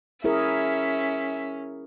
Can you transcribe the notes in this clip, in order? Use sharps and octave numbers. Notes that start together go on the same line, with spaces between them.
C#4 E4 G#4 A#4 E5